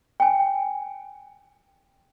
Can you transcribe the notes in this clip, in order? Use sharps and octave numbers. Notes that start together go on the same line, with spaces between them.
G5 G#5